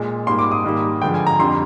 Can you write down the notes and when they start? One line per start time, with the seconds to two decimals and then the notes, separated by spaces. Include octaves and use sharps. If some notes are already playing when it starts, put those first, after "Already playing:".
Already playing: A#2 G#3
0.27 G#2 G3 A#3 C6
0.39 D6
0.51 D#6
0.64 G#2 D#3 G3 A#3
1.02 G2 D3 F3 G#3 G5
1.14 G#5
1.27 A#5
1.39 F2 D3 G3 C6